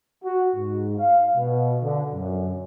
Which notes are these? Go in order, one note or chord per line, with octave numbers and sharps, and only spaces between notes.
F#4
G#2
F5
B2
D3
F#2